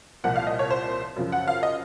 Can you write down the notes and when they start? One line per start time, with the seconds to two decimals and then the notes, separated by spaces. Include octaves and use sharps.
0.24 C2 A#2 F3 F#5
0.36 F5
0.47 D#5
0.59 C#5
0.71 C5
1.16 F#2 C#3 F3
1.32 F#5
1.48 F5
1.63 D#5